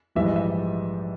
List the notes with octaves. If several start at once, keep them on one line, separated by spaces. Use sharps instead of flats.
A#1 G#2 E3 G3 E5
D#5
E5